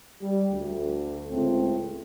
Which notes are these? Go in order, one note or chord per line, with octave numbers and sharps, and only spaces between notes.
G3
D2
C#2 A2 C4